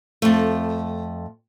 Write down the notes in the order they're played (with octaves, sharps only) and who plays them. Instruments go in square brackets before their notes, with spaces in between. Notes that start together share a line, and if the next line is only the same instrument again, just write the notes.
[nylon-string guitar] F2 A3